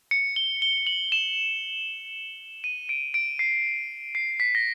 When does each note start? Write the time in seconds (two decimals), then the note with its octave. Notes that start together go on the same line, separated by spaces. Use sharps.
0.11 C#7
0.36 G7
0.62 G7
0.87 F#7
1.12 E7
2.64 D#7
2.89 D7
3.14 D7
3.39 C7
4.15 C7
4.40 B6
4.55 A#6